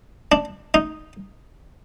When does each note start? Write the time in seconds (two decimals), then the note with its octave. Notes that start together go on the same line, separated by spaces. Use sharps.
0.32 D4
0.74 D#4